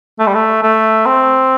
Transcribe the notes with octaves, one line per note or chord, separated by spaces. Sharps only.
A3
G3
A3
A3
C4